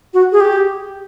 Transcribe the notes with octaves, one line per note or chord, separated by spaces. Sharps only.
F#4
G#4
G4